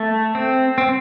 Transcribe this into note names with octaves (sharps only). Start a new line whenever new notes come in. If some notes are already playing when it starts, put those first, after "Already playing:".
Already playing: A3
C4
C4